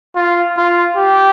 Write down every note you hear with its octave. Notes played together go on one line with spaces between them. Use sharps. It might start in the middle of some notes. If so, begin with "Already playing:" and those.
F4
F4
G4